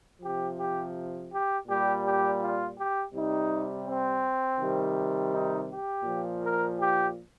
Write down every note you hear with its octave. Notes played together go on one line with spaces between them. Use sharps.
C3 F3 G4
G4
G4
A#2 G3 G4
G4
F4
G4
C3 G3 D#4
C4
C3 D#3 G3
D#4
G4
A#2 F3
A#4
G4